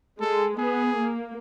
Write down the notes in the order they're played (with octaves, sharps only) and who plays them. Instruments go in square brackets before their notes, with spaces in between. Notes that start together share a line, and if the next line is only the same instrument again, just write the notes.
[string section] G#3 [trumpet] A4
[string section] B3 [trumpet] G#4
[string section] A#3